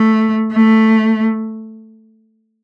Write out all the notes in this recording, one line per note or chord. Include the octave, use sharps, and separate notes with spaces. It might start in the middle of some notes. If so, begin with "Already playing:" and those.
Already playing: A3
A3